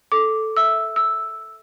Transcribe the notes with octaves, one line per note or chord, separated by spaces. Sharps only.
A4 D6
E5 E6
E6